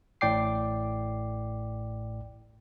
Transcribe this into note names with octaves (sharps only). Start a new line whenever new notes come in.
A1 A2 D5 G5 D6 C7